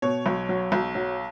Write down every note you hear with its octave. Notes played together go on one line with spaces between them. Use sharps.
B2 C#5
B1
F#3
B1
F#3